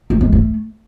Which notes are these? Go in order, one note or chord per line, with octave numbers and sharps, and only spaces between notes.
A3
G#3
A3